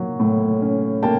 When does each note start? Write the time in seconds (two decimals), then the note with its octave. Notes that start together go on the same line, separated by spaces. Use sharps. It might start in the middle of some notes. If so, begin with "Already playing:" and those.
Already playing: F#3 A#3
0.20 A2
0.62 C#4
1.03 A#3 G5 A5